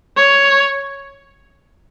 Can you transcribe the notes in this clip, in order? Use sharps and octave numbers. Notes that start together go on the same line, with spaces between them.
C#5